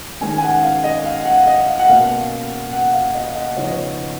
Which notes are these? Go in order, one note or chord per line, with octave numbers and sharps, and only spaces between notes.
D#3 G#3 C#4 G#5
G#5
F#5
F5
D#5
F5
F#5
D#5
F5
F#5
B2 A#3 C#4 F5
F#5
F5
D#5
D#5
C#3 F3 B3 D#4 C#5
D#5
C#5